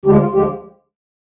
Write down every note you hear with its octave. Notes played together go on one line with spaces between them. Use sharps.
D2 D3 F3 G#3 G4
F4
D2 D3 F3 G#3 G4